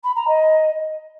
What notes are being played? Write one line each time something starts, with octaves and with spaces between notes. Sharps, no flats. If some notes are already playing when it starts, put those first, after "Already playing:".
B5
A#5
D#5